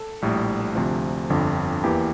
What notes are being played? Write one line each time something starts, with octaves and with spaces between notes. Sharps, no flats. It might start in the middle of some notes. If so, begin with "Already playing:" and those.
Already playing: A4
A#1 A2 G3
D2 C3 F3
G1 F2 D3
E2 E3 A#3 G4